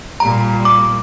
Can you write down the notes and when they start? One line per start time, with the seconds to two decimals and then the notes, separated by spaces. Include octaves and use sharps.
0.20 A#2 G3 A#5
0.65 D6